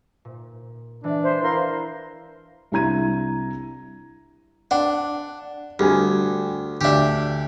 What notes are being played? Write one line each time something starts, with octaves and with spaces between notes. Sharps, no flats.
A#2
E3 G#3 D4
C5 E5
E4 A#4 F5 C6
C2 D4 E4 A#5 G#6 D#7
D4 F#5
D2 G3 G#5
D2 D4 G4 E5